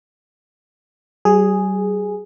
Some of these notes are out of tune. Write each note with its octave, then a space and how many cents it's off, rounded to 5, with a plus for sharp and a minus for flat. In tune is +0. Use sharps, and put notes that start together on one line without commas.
G3 -45 G#4 +0